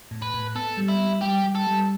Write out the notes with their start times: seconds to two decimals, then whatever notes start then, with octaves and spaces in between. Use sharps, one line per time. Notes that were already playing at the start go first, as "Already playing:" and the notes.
0.11 A2
0.22 B4
0.34 A2
0.55 B3 A4
0.77 G3
0.88 E4
0.99 G3
1.22 G3 G4
1.44 G3
1.55 A4
1.67 G3